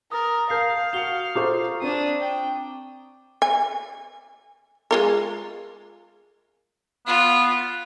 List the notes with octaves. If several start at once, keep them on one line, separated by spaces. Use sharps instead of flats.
A#4 D#6 A6
A#4 F5 A5 G6 C7
F#4 C#7 F7 G7
F4 A4 C5 A#5 C#6 D6
C4 D4 D#6
G5
G#5
G#3 F4 A#4
B3 F4